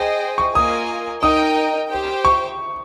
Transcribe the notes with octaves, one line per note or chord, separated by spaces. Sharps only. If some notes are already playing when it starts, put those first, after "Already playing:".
Already playing: G#4 C5 D#5 G5
C#6
A#3 F4 A#4 D#5 G#5 D#6
D#4 A#4 D#5 G5 D#6
G4 C5 G5
C#6